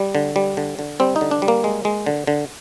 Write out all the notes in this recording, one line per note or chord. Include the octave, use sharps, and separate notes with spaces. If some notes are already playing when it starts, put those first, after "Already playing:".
Already playing: G3
D3
G3
D3
D3
G3 C4
D#4
D3
D4
G3
A#3
G#3
G#3
D3
D3